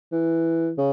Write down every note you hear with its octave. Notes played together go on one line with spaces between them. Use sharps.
E3
C#3